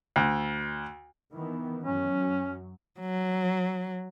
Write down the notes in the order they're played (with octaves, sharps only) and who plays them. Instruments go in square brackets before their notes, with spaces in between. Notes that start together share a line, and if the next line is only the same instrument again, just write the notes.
[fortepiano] D2
[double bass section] D#3 E3 B3
[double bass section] F#2 F#3 [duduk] C#4
[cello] F#3